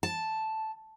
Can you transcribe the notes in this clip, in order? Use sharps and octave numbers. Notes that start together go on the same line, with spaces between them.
A5